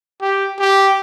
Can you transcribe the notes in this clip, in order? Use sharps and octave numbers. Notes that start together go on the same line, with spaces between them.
G4
G4